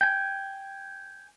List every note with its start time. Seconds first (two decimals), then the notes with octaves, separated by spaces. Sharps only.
0.01 G5 G#5